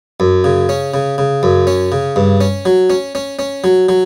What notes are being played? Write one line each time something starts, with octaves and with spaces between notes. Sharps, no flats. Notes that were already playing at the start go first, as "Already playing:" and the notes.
F#2
C#3
C#4
C#3
C#3
F#2
C#4
C#3
G2
C#4
F#3
C#4
C#4
C#4
F#3
F#3